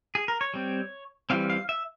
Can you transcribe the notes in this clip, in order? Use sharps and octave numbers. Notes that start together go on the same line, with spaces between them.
G#4
A#4
C#5
G3 C4
E3 G3 C4 F5
F5
E5